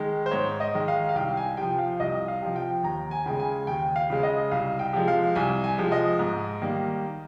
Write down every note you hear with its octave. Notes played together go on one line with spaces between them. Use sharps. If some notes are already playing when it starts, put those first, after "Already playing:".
Already playing: D#3 G#3
C5
G#2 C#5
D#5
D#3 G#3
F5
F5
C2 G5
G#5
C3 F3 G5
F5
C2 D#5
F5
C3 F3
G5
D#2 A#5
G#5
C#3 G#3 G5
G#5
D#2 G5
F5
C#3 G#3
D#5
C2 F5
G5
C3 F3 G#3
F5
C2 G#5
G#5
C3 F3 G#3
D#5
G#2
D#3 G3 A#3